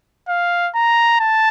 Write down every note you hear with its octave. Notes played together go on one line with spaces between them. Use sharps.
F5
A#5
A5